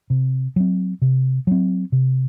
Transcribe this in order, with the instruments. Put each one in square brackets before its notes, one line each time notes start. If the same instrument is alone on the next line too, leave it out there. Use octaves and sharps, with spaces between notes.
[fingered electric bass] C3
F#3 C4
C3
F#3 C4
C3